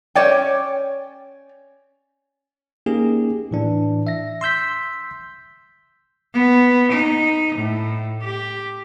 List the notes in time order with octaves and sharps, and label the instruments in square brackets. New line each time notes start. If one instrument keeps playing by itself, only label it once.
[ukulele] C#4 C#5 D5 G5
[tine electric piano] A#3 C#4 D#4 G4 G#4
A2 E3 D4
E5 A#6
C6 E6 G6 B6
[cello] B3
D#4
A2
G4